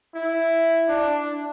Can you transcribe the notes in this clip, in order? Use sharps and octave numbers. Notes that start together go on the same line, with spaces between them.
E4
D4